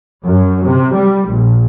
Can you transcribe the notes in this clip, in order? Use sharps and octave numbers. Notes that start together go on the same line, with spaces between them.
F#2
C3
G3
A#1